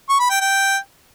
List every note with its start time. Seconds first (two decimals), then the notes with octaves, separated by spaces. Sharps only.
0.09 C#6
0.19 B5
0.30 G5
0.40 G5